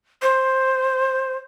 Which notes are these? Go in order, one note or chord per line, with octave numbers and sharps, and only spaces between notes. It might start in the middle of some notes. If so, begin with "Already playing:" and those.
C5